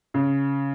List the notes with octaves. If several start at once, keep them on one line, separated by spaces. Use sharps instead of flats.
C#3